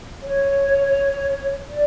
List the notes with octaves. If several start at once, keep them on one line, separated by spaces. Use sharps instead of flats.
C#5
D5